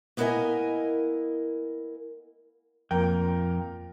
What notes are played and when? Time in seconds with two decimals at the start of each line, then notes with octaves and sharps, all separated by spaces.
0.17 A#3 B3 E4 A#4 D#5 G#5
2.91 F2 A#2 A#4 G5